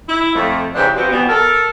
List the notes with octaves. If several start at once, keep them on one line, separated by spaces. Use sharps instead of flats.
E4
F2 A3
G#2 C#3 E3 D4 G4 C5
F3 G3 B3 C4 F#4 G4
B2 E3 G3 B3
A4 A#4